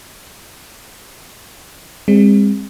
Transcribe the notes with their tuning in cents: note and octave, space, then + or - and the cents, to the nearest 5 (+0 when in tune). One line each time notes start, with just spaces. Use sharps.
G#3 -35 C4 +15